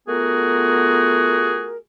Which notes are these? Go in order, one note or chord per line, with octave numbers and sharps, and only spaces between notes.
A3 B3 F4 F#4 G#4 A#4